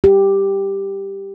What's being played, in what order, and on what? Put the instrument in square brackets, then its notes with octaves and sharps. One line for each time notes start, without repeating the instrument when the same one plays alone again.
[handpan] G4